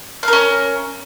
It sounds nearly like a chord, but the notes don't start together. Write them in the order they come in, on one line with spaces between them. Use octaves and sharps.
F5 A#4 C#4